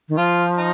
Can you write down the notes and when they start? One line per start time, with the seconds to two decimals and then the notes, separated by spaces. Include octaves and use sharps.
0.09 D#3
0.18 F3 F4
0.58 D#4